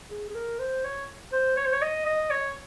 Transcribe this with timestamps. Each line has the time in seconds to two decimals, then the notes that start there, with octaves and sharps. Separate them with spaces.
0.11 G#4
0.29 G#4
0.35 A#4
0.59 C5
0.85 C#5
1.32 C5
1.57 C#5
1.65 C5
1.73 C#5
1.82 D#5
2.06 D#5
2.30 C#5